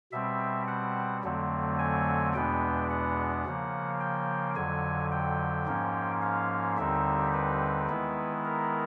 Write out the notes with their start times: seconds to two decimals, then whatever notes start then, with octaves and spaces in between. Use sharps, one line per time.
0.12 B2 G3 C4 E5
0.68 F#5
1.23 F2 D3 F#3 A3 C4
1.79 G#5
2.34 E2 B2 G#3 B3 D4 G5
2.90 F#5
3.45 C#3 F3 A#3
4.00 G5
4.56 F2 D3 F#3 G#5
5.12 G5
5.66 G#2 F3 A#3 C#4
6.22 F5
6.77 D#2 D3 G3 C4 D#4 E5
7.33 B4
7.89 D#3 G#3 B3 E4
8.45 A#4